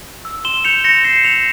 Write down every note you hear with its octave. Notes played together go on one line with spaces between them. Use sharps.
E6
C6 E7 G7
G6 C#7 F7
C6 A#6 C#7
G6 C7 E7
E6 C#7 F7